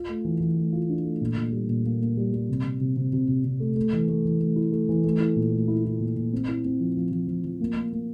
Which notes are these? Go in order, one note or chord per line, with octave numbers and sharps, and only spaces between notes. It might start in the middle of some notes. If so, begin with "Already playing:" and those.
Already playing: F4
A3
E3
E3
A3
F4
D4
A3
A#2
A#2
G3
A#2
A#3
A#3
G3
G3
C3
C3
C3
C3
C3
C3
C3
A3
A3
E3
A3
E3
A3
E4
A3
E3
A3
E4
A#2
A3
E4
E4
A#2
A#2
C4
E4
C4
F3
F3
F3
F3
F3
A#3
A#3
A#3